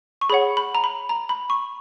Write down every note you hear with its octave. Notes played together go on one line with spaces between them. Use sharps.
C#6
G#4 C#5 F#5 B5
B5
A#5
B5
A#5
B5
C#6